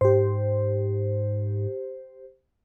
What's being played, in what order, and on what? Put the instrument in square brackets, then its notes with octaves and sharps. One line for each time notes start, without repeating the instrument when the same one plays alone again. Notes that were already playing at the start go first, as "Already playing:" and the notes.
[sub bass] G#2 [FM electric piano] G4 C5